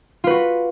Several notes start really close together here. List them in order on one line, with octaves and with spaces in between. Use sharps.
F4 B4 F#4